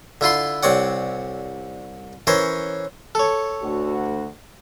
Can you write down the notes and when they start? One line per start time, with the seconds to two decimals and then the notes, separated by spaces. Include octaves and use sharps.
0.21 D3 E4 F4 C6
0.63 C2 C4 C#5 D5 F#5
2.27 E3 C#4 A#4 C5 C#5
3.15 A4 C#5
3.62 D2 F#4